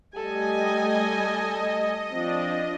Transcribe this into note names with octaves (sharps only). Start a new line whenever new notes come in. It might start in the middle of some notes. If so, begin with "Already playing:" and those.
G3 A3 G4 A4 D#5 G#5
F3 C4 D4